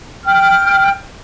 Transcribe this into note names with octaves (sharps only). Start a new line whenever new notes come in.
G5 F6